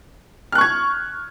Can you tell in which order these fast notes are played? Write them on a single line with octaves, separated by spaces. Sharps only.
F6 F#6 C#6 G#6